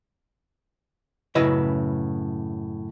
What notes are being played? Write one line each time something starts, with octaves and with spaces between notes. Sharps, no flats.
F#2 A2 C#3 E4 B4 D#5